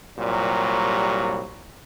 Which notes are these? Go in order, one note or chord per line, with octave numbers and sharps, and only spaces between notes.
C2 A#2 F#3 G3